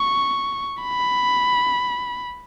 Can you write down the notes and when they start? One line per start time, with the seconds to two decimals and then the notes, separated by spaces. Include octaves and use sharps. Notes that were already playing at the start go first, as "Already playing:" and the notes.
Already playing: C#6
0.82 B5